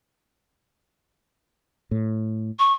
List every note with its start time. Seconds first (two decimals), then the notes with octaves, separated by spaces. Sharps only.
1.91 A2
2.59 C#6